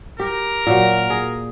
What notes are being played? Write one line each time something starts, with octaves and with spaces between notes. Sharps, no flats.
G4 A#4
A#2 F#3
G#4